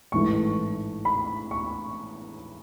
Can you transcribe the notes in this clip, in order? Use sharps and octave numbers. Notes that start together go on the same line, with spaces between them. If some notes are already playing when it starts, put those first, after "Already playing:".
A1 G#2 E3 A3 C#6
B5
C#6